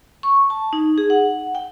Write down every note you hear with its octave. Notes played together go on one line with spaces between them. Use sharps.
C#6
A5
D#4
G#4
F#5
G5